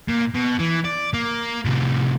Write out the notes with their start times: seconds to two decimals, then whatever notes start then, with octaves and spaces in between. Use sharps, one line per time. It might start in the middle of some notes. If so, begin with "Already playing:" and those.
0.08 A#2
0.34 B2
0.59 E3
0.85 D5
1.13 A#3
1.65 A2 C3